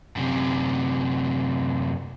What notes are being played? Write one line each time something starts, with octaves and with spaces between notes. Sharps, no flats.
F#2 C3